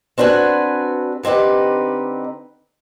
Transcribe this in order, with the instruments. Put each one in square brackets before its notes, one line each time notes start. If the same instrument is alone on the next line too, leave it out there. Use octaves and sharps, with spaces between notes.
[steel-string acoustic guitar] C4 D4 F#4 B4 G#5
D3 C4 D#4 G4 B4